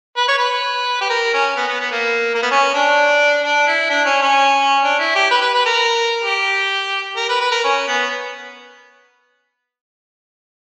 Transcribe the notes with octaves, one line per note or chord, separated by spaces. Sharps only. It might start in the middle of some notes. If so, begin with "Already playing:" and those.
B4
C#5
B4
G4
A#4
C#4
B3
B3
B3
A#3
A#3
B3
C#4
D4
D4
E4
D4
C#4
C#4
D4
E4
G4
B4
B4
B4
A#4
G4
A#4
B4
B4
A#4
C#4
B3